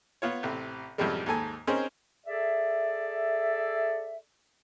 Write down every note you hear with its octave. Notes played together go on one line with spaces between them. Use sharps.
B3 F4 C#5
A1 C3
A1 F#2 C3 F3 G3 G#3
D#2 G#2 A4 G#5
C4 C#4 D#4 G#4 A#4 C5
G#4 A4 D5 E5